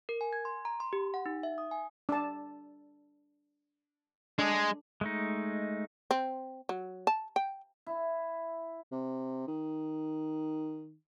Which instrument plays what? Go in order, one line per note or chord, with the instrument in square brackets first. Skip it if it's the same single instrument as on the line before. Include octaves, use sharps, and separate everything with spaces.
[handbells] A#4
G#5
G#6
C6
A#5
C6
G4
F#5
D#4
E5
D#6
G#5
[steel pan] D4 A5
[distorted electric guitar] G#3 G#4 [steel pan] D4
[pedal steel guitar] G#3 A3 D#4
[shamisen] C4
F#3
A5
G5
[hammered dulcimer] E4
[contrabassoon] C3
D#3